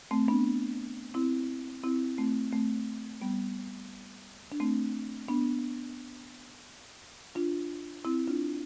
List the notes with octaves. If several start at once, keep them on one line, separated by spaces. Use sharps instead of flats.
A3 C4
B3 D4
C4 E4
C4 E4
A3 C4
A3 C4
G3 B3
D4
A3 C4
B3 D4
D4 F4
C4 E4
D4 F4